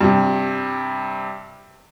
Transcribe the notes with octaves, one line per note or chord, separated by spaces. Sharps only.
G2 C3